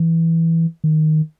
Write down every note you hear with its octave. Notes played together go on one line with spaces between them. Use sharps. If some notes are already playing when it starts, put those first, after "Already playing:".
Already playing: E3
D#3